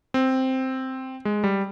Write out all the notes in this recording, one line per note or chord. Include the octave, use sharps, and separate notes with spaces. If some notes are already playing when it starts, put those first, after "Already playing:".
C4
G#3
G3